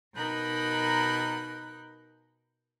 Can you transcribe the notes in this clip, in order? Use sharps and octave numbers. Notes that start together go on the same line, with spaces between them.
B2 D#4 A#4 B5 F#6 G6